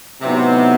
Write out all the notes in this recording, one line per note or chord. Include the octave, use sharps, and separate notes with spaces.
A2 C3 F#3 B3 D#4